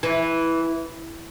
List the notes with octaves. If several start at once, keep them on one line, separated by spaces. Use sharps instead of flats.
E3